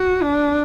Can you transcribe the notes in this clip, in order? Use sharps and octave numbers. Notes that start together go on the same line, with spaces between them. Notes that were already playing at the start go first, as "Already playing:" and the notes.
Already playing: F#4
D4